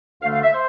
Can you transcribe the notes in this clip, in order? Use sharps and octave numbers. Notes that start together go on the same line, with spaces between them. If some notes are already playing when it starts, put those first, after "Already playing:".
D2 D3 A3 F5
F5
E5
C5